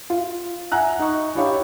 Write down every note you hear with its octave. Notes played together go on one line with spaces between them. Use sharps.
F4
E5 F#5 G#5 A#5 F#6
D#4 C#6
D4 E4 G4 C#5 F5 C#6